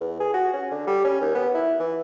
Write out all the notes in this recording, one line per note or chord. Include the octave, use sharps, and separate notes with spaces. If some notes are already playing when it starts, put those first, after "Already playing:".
E2
G#4
F#4
C#4
D3
G3
C#4
D#2
B3
E4
E3